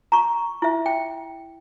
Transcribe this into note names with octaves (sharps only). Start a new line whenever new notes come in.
A#5 C#6
E4 E5
G5